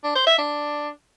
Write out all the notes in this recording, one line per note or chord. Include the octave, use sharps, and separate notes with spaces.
D4
C5
E5
D4